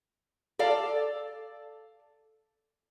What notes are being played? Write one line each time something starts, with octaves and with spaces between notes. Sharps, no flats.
A4 D5 F5